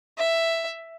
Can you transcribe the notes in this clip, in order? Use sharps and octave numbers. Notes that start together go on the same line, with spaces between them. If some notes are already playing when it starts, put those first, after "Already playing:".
E5